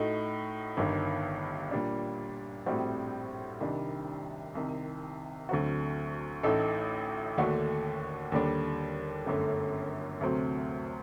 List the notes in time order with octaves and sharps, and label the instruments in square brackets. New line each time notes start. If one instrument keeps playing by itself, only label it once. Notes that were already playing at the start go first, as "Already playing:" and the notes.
Already playing: [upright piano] A2 A3 D#4 F#4
G1 G2 D#3
A#2 G3 D4
A#1 A2 G3 C4 F#4
C2 C3 D#3 G3 D4
C2 C3 D#3
D2 D3 F#3 C4 F#4
A1 A2 A3 D#4 A4
D#2 D3 A3 D4 F#4
D#2 D3 G3 D4
G1 F#2 D3 A3
D2 C3 F#3 A3 C4